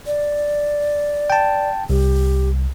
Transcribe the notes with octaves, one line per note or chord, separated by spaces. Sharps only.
D5
G5 A5
C2 G4